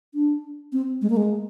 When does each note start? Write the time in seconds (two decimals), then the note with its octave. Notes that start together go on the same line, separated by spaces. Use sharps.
0.14 D4
0.73 C4
1.02 G#3
1.10 A#3
1.17 G#3